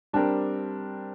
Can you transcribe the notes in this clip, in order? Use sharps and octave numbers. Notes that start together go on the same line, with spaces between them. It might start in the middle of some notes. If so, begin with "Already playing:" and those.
G3 C4 D4 G4 A#4